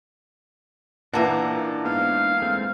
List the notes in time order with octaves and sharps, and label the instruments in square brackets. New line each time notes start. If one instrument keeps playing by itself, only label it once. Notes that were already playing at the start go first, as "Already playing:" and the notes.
[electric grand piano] A#2 F#5 A5 [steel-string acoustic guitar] E3 A#3 A#5 [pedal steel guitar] D4 D#4
[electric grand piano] G#2 B3 [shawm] F5
[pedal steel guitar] G#3 A3 C4